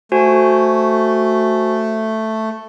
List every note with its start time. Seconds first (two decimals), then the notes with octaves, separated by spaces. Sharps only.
0.12 A3 F#4 C5 G#5